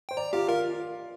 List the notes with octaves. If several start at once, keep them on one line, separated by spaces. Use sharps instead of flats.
C5 G5
D5 A#5
F4 G4 F5
F4 A#4 F5